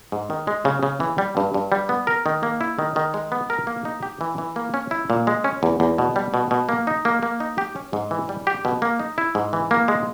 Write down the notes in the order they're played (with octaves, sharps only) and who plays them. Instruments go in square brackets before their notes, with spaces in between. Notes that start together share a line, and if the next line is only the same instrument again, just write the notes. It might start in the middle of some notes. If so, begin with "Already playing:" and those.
[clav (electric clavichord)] G#2
D#3
G#3
C#3
C#3
E3
G3
G2
G2
G3
B3
A#4
D#3
A#3
E4
D#3
D#3
G#3
B3
A#4
A#3
D#4
G4
E3
E3
A#3
C#4
E4
A#2
G#3
C#4
E2
E2
B2
G3
B2
B2
A#3
D#4
A#3
A#3
D#4
G4
C#4
G#2
E3
G3
G4
B2
A#3
D#4
E4
G#2
E3
A#3
G#3